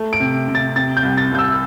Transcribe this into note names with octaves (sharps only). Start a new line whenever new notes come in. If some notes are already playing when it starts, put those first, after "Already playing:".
Already playing: A3
D7
C3
C3
A6
C3 A6
G6
C2
A6
C2 G6
E6